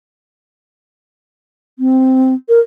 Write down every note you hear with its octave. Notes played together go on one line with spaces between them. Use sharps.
C4
A#4